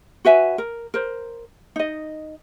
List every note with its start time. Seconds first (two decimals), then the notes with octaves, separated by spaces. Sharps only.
0.25 F#4 B4 E5 G#5
0.58 A#4
0.94 A#4 C5
1.76 D#4 D#5